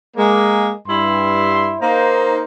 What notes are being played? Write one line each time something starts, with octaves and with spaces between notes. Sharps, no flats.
G#3 A#3
G2 E4 C6
A#3 D#4 C5